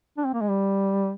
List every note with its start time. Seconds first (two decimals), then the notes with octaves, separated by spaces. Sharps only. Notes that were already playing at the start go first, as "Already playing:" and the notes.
0.18 D4
0.26 C4
0.34 A#3
0.41 G#3
0.49 G3